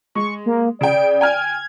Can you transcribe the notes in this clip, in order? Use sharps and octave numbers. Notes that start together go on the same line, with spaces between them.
G#3 C#6
A#3
C#3 D5 G5 D7
G5 G#5 F6 G#6